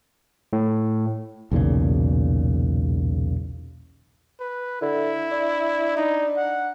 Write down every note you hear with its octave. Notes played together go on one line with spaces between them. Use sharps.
A2
B1 E2 A#2 C#3
B4
D3 E4
D4
D#4
F#5